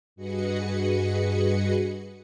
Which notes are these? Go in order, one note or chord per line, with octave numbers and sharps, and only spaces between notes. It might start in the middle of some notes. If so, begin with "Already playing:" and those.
G2 F#4 G#4 B4 D#5 C#7